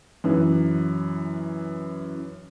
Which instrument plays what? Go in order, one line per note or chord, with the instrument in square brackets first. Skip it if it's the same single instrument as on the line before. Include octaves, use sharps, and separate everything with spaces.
[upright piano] F#2 E3